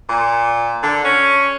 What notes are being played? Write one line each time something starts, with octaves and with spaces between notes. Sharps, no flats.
A#2
D3
C#4